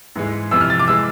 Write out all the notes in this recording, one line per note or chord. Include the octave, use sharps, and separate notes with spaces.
G#2 E3 G#3
F2 C3 E3 E6
F6
A6
D6
E3 G#3 E6